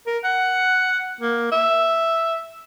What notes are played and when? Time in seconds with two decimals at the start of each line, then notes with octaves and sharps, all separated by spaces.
0.06 A#4
0.24 F#5
1.21 A#3
1.52 E5